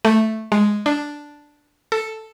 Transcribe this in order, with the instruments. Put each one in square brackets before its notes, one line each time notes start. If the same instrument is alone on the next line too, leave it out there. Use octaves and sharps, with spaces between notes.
[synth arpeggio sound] A3
G#3
D4
A4